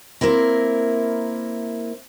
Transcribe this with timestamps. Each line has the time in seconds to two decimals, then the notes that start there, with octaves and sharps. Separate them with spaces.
0.21 A#3 C4 E4 A#4